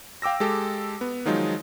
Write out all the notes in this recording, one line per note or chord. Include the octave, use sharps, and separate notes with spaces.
F5 G5 D6 E6 A#6
G#3 G4 A4
B3
D#3 F3 F#3 G#3 D#4 F4